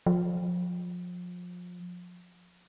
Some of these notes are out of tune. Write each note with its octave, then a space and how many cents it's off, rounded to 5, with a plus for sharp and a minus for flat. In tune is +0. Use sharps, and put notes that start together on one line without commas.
F3 +30